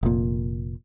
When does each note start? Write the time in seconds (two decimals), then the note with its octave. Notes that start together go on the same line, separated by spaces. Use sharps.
0.03 F1 A#2